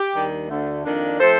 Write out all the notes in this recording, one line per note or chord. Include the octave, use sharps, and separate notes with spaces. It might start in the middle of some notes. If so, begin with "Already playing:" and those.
Already playing: G4
D#2 D#3 G3 D4
D2 D3 A3
F2 D#3 A#3 D4
F3 A3 C4 A4 C5